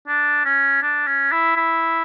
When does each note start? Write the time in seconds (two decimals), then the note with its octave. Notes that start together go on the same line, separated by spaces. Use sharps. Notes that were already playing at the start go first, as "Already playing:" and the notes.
0.07 D4
0.45 C#4
0.82 D4
1.07 C#4
1.32 E4
1.56 E4